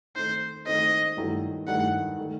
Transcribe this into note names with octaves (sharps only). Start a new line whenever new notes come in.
D#3 A3 C4 D#4 C5
D#3 A3 C4 D#4 D#5
G2 D#3 F#3 A3 E4
G2 D#3 F#3 A3 E4 F#5
D#3 A3